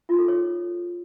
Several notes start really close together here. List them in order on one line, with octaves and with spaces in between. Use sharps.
F4 D#4 A4 G#4 C#5